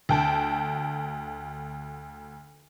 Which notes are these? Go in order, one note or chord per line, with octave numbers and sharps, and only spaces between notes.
D2 G5 A5